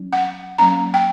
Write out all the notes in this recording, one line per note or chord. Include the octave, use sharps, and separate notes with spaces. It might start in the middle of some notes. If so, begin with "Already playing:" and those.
Already playing: F#3 C#4
F#5
F#3 A#3 C#4 A#5
G5